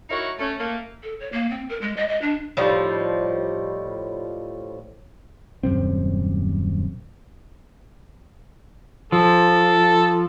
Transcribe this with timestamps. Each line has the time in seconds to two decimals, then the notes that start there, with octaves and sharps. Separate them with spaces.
0.10 D#4 E4 F#4 A#4 C#5
0.39 A3 C#4
0.59 A3 A#3
1.03 A4
1.20 C#5
1.32 A#3
1.50 C4
1.69 A#4
1.81 G#3
1.97 D#5
2.08 D#5
2.22 D4
2.57 A2 F3 G3 D#4
5.63 D#1 F#2 C3 C4
9.12 F3 A4